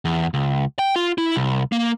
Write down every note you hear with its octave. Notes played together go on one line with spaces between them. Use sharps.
E2
C#2
G5
F4
E4
C2
A#3